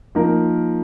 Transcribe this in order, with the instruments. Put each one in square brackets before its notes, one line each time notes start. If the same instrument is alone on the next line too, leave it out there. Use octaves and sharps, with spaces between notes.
[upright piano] F3 A#3 D#4 A#4